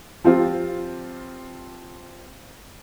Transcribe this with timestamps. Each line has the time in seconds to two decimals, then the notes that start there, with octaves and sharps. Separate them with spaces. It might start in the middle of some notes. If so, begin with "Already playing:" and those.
0.24 F3 C4 F4 G4